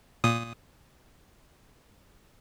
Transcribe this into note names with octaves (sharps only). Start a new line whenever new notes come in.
A#2 D#6